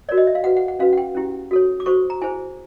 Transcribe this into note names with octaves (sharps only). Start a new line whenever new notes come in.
F#4 A#4 C#5 D5
D#5
E5
F5
F#4 B4 F#5
F#5
F#5
C#4 F#4 B4 F5
F#5
G5
C#4 E4 G4
F#4 A4 C#5
D6
F#4 A4 C5 C#6
A#5
E4 G#4 C5 G#5